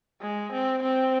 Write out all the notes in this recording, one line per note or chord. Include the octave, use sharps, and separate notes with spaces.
G#3
C4
C4